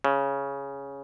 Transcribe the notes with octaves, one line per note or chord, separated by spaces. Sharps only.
C#3